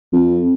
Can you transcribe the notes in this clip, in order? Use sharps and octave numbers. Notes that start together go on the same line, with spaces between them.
F2